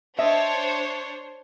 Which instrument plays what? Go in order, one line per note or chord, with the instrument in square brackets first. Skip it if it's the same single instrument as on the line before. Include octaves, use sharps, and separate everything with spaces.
[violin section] D4 C5 C#5 [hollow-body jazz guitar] D#5 E5